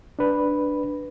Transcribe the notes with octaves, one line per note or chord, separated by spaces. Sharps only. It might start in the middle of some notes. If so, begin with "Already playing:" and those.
D4 B4